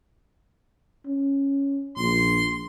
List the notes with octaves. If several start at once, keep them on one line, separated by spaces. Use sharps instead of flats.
C#4
A#1 C6